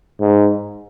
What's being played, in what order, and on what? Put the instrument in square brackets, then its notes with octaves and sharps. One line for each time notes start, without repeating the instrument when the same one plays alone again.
[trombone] G#2